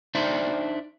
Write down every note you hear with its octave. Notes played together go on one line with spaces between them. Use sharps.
D4 D#4 C5 D5 E5